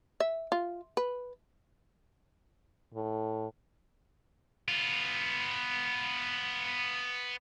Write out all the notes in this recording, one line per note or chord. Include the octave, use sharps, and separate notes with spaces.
E5
F4
B4
A2
B3 F4